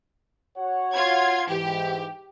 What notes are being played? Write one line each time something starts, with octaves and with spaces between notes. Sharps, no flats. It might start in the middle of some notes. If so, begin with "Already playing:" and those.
F#4 C#5 F#5
F4 G#6
G#2 E3 G4